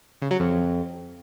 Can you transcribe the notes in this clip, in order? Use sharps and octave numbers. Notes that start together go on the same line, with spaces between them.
C#3
F#3
F2